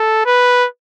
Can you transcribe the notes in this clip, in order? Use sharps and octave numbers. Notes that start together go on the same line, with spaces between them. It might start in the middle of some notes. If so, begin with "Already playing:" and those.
Already playing: A4
B4